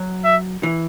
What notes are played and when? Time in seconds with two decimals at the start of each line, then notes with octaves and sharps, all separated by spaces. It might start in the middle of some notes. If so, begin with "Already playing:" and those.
Already playing: F#3
0.25 E5
0.63 E3